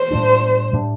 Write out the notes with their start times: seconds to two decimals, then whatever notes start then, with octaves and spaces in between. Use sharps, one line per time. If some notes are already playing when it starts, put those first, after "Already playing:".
Already playing: C5
0.11 A2 G3 D4
0.73 A2 G3 D4